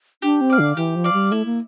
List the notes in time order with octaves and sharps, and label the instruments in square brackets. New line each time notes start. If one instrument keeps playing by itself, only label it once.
[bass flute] D4 [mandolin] G4
[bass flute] C4
[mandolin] D5 F5
[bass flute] D3
[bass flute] E3 [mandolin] G4
[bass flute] F3
[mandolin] D5 F5
[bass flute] G3
[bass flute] A3 [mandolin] E4
[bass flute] A#3